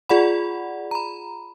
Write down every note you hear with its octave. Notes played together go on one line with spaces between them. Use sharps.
F4 G#4 D5 F#5 B5
A#5 B5